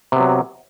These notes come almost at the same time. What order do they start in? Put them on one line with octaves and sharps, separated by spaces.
C3 B3 F#3